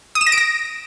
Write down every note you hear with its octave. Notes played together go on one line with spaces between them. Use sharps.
D#6
E7
A#6
D7
A#6